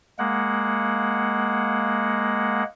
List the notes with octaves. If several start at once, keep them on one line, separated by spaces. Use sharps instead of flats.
G#3 A#3 F#5